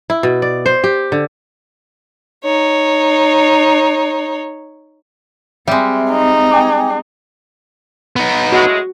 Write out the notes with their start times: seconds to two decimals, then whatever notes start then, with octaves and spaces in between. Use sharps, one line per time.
0.10 E4
0.23 B2
0.42 D5
0.66 C5
0.84 G4
1.12 D3
2.45 D#4 C#5
5.68 G3 G#3 C4 E5
6.11 D#4
6.51 G5 G#5 D6
8.16 B3 D#4
8.52 A2 F#3 G#3 F#4